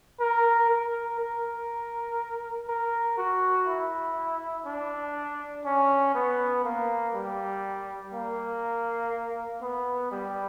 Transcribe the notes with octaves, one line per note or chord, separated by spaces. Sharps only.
A#4
A#4
A#4
A#4
F#4
E4
D4
C#4
B3
A#3
G3
A#3
B3
G3